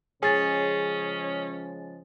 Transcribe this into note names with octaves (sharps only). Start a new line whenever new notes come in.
C#3 F3 G#3 C#4 G#4 G#5 A6